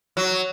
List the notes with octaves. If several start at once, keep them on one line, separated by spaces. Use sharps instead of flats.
F#3